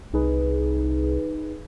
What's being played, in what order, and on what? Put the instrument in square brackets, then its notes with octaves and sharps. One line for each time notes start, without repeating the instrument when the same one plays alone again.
[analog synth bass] C2 [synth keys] D#4 G#4 B4